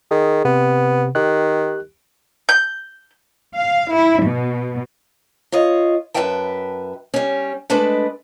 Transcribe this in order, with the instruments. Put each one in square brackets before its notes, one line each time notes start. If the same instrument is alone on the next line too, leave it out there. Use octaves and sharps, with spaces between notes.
[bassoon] D#3 [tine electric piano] G#4
[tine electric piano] C3 [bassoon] B3
[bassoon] D#3 [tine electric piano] G4 F#6
[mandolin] G6
[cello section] F5
E4
B2
[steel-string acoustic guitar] F4 C#5 D#5
F#2 B2 B4 E5 G5 A5
G3 C#4
G#3 A3 D4 A4 B4 D#5